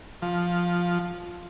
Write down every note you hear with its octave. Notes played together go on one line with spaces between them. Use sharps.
F3